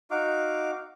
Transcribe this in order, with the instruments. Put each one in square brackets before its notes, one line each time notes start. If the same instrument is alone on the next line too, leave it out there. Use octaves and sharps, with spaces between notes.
[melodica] D#4 F#4 F5 D6